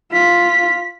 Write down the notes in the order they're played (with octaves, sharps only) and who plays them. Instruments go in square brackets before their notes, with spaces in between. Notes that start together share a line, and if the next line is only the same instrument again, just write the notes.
[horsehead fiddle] F4 [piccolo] B6